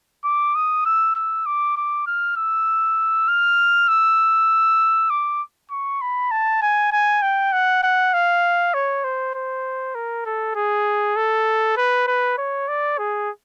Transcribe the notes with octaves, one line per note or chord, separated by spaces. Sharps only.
D6
D#6
E6
E6
D6
D6
F6
E6
F6
E6
D6
C#6
B5
A5
G#5
G#5
G5
F#5
F#5
F5
C#5
C5
C5
A#4
A4
G#4
A4
B4
B4
C#5
D5
G#4